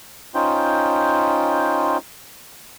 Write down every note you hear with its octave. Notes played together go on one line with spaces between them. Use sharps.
C#4 D#4 F4 C5 G5